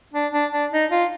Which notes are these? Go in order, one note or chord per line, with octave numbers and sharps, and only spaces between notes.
D4
D4
D4
D#4
F4